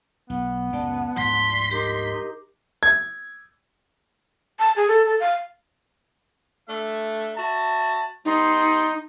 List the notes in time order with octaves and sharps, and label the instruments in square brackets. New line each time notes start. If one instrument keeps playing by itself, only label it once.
[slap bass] B1 [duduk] B3
[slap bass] C#2 F#2 A2 [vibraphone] D5 A5
[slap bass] D2 G#2 F3 [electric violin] C6 B6
[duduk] D#4 [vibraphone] G4 A#4 D6
[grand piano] G#6
[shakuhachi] A5
G#4
A4
A4
F5
[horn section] A3 D4 E5
F#4 E5 A5
[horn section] G3 B3 C6 [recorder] D#4